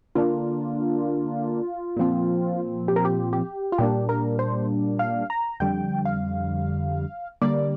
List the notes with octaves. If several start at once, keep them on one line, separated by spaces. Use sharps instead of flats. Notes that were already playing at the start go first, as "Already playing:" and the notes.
D3 A#3 D4 F4
A#2 F3 C4
G4
A#4
G4
G4
F4
A#2 G3 A#3 D4 G4
A#4
C5
F5
A#5
F2 D3 G3 G5
F5
D3 G3 A#3 D5